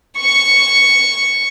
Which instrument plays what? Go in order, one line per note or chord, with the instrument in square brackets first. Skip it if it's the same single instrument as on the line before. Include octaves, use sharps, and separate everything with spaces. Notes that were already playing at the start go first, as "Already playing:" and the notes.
[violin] C#6 C#7